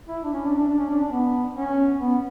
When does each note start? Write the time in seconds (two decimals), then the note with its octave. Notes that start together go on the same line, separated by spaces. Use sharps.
0.08 E4
0.23 D4
0.33 C#4
0.45 D4
0.56 D4
0.67 D4
0.79 C#4
0.90 D4
1.01 D4
1.12 B3
1.56 C#4
2.00 B3